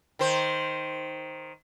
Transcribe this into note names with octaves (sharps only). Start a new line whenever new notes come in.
D#3 C5